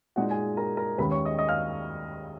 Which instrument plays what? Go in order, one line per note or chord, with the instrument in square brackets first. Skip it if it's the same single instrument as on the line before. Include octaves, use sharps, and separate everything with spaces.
[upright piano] A#2 G#3 D#4 F#4 F#5
G#4 G#5
A#4 A#5
A#4 A#5
D#2 D#3 G#3 C#4 B4 B5
C#5 C#6
D#5 D#6
D#5 D#6
F5 F6